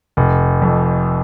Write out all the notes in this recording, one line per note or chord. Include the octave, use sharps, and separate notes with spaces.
F1
F2